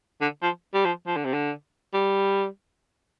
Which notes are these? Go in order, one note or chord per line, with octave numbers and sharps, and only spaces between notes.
D3
F3
G3
F3
F3
D3
C3
D3
G3